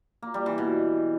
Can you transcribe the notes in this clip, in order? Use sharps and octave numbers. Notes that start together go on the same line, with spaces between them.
A#3
G3
E3
B2